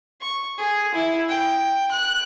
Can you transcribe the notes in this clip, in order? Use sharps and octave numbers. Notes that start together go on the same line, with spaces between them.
C#6
G#4
E4
G5
F#6